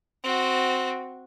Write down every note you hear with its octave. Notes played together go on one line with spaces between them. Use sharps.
C4 F#4